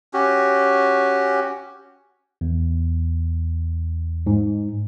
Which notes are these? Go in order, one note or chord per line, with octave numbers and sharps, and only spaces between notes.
C#4 F#4 G4
E2
G#2